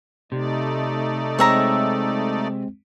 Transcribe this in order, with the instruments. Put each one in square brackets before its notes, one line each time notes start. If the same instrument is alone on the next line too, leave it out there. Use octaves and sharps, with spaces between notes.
[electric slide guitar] C3 [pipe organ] A3 D#4 D5
[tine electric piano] G#3 C4 [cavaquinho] C#5 E5 A#5